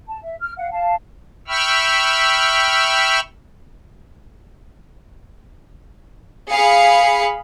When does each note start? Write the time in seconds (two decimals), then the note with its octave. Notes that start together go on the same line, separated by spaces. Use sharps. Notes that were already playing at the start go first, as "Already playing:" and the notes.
0.08 A5
0.23 E5
0.40 F6
0.57 F5 F#5
0.71 F5 A5
1.48 E5 G5 B5 C#6 E6 F6
6.50 G#4 F5 B5 C#7